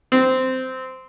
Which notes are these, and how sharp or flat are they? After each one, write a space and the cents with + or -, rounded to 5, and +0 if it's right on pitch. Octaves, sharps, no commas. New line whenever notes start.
C4 -15